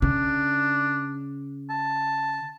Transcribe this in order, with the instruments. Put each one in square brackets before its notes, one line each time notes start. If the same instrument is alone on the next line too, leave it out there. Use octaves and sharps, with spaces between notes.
[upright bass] C#3 [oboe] D4
[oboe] A5